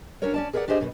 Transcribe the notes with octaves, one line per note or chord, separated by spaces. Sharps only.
C#4 D4 F#4 A#4 C#5
C#4 D5 A5
G#4 A#4 B4 C#5 D5 F#5
D4 G4 G#4 C5 D#5 E5
F#2 B2 D3 D#3